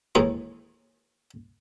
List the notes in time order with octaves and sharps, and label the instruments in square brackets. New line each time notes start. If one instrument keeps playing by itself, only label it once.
[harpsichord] D#2 A2 E3 G#3 D#4